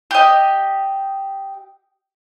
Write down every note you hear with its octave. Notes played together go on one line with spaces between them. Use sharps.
G4 D#5